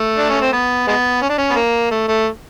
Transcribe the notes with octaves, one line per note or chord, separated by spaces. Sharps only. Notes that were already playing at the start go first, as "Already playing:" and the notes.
Already playing: A3
D4
C#4
C4
B3
G#3 B3
C#4
D4
C#4
B3
A#3
A3
A3